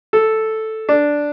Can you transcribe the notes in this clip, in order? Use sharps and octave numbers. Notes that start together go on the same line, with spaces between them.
A4
D4